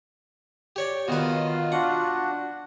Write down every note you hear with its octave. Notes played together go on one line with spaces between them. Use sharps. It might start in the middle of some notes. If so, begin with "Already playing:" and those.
G4 C#5 D5
B2 D#3 F4 B4 D#5
D4 F#4 F#5